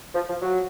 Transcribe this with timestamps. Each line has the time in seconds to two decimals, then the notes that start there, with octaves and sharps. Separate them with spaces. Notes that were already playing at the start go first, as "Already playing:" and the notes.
0.15 F3
0.28 F3
0.42 F#3